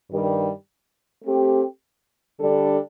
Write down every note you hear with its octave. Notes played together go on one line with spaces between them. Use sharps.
G2 D#3 G3
A3 C4 G4
D3 G3 D4 A4